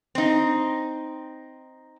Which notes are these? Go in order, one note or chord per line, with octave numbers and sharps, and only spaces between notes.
C4 D#4